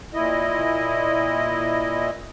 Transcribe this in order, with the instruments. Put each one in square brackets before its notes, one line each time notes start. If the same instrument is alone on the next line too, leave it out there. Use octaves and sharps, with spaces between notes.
[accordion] A#2 E4 D#5